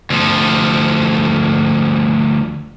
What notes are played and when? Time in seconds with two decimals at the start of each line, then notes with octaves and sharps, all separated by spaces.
0.10 D2 F3